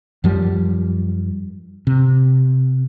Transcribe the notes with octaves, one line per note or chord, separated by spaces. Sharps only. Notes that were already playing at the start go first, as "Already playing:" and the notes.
F#2 F3 G3
C3